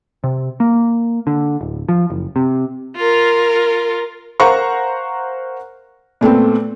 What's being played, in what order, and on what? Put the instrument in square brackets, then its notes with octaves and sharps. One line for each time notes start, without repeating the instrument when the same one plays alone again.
[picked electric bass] C3
A#3
D3
D1
F3
F#1
C3
[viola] F4 A#4
[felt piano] A#4 C5 F5 F#5 A#5 C#6
A#2 A3 B3 C4